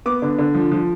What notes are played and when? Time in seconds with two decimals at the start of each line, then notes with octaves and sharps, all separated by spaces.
0.06 B3 D6
0.22 D3
0.38 D3
0.54 F3
0.72 F3